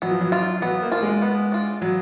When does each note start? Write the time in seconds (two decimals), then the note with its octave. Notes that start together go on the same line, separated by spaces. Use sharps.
0.02 F#3 B3
0.11 F3
0.21 F#3
0.32 D4 F4
0.62 F#3 B3
0.82 A#3
0.92 D4 F4
1.02 G#3
1.22 B3
1.52 D4 F4
1.82 F#3 B3